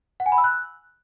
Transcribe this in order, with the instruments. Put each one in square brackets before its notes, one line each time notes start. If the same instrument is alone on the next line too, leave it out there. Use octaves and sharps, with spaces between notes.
[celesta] F#5
G#5
B5
E6
F#6